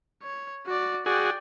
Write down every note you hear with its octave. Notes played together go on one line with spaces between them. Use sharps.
C#5
F#4 D5
F#4 G#4 D5 G5